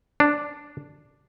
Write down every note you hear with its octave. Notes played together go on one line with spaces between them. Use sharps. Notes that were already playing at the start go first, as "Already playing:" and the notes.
D4